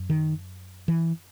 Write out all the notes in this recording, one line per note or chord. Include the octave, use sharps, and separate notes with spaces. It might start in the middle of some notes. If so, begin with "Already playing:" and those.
Already playing: F#2
D#3
E3